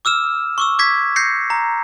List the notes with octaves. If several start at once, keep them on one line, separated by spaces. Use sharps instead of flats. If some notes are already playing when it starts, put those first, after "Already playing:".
D6 E6 F6 E7
C#6 D6 E6
D6 G#6 B6
G6 A#6 C7 C#7
A#5